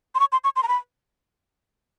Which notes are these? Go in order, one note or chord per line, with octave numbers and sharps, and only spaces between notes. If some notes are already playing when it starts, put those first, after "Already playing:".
C6
C#6
C6
C#6
C6
A#5
B5